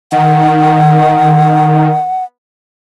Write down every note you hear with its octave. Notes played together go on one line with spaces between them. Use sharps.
D#3 F#5